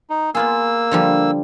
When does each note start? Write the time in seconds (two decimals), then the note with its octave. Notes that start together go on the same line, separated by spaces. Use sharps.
0.10 D#4
0.35 A#3 B3 F4 G#4 E6
0.91 D3 F3 G3